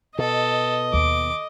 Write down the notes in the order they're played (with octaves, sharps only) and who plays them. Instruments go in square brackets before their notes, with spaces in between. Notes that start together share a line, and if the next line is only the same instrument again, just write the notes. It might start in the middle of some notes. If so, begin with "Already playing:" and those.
[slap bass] B2 [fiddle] A4 [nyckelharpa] D#5
[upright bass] D#2 [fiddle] D6